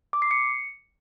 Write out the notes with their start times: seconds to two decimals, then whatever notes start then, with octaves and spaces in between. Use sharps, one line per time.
0.13 D6
0.22 C7
0.31 C#7